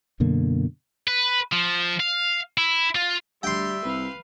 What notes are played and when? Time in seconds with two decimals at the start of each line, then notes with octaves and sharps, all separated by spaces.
0.20 F#2 B2 D3 A#3
1.07 B4
1.52 F3
2.00 F5
2.58 E4
2.95 F4
3.43 D2 G3 E5 G5 C6
3.85 C2 B4 F5